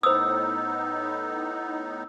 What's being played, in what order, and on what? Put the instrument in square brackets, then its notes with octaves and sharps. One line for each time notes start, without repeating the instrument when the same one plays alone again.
[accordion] A2 B3 D#4 [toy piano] C5 D#6 [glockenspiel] E6